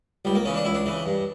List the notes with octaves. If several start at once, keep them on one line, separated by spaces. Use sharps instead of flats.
C#2 G3
A#3
C#3 E3 C#4
D4
C#2 E4
D4
C#3 E3
G2